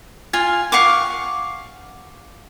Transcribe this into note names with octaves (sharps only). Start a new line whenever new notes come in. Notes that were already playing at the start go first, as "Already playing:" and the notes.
F4 G#5
F5 F#5 C#6 D6